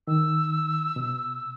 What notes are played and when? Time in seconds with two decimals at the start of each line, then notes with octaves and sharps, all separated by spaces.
0.07 D#3 E6
0.96 B2